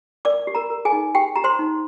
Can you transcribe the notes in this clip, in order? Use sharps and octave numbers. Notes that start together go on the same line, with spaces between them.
A#4 D5 D6
G4
A#4 A#5
A#4
G#4 G#5
D#4
G4 G5
G4 A#5
C5 C6
D#4